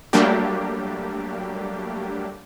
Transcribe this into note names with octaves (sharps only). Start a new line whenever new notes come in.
F#3 G3 A3 A#3 D4 G4